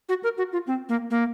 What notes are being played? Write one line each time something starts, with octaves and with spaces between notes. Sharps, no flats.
F#4
A#4
F#4
F4
C4
A#3
A#3